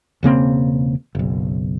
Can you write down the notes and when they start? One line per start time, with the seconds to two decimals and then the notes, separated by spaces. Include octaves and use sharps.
0.23 E1 C#3 A#3 C4
1.15 F#1 B1